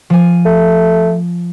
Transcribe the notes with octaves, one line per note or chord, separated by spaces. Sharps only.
F3 G#5
A3